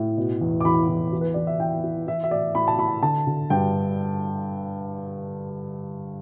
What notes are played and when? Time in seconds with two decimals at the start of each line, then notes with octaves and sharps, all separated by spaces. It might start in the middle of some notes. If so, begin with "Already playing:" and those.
Already playing: A2
0.18 B2
0.41 E2
0.61 D6
0.65 E2 B5
0.89 E2
1.13 E3
1.21 B4
1.34 E3 D5
1.47 E5
1.60 E3 G5
1.83 E3
2.07 E3 E5
2.24 E5
2.31 A2 D5
2.55 A2 B5
2.68 A5
2.78 A2 B5
3.03 D3 A5
3.27 D3
3.50 G2 G5